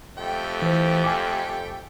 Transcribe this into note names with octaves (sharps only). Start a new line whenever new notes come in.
F2 A3 G4 G5
E3 C5
G#5 D6